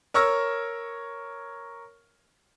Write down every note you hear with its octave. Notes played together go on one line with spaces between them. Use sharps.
A#4 C#5 C#6 E6 F6 A#6